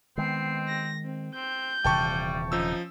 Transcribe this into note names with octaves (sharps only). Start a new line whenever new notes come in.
D#3 G#3 B3 C4 C7
A#6
C4
C4 G6
D#1 C3 E3 G3 G5 A5 C#6
F3 C#4 D#4 E6